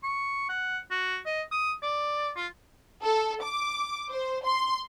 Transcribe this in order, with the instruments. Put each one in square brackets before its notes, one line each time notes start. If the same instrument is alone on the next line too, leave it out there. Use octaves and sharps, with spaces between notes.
[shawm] C#6
F#5
F#4
D#5
D#6
D5
F4
[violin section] A4
D6
C5
C6